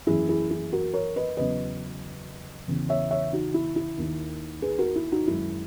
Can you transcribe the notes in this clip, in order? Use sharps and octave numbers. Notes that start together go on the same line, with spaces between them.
F#2 E3 A#3 C#4 E4 G#4
E4 G#4
E4 G#4
F#4 A#4
A#4 C#5
B4 D#5
E2 C#3 F#3 C#4 B4 D#5
E2 C#3 E3 B3
C#5 E5
C#5 E5
D#4 F#4
E4
E4
D#2 D#3 A#3 D#4
G#4 B4
F#4 A#4
E4
D#4 F#4
F#2 D#3 G#3 E4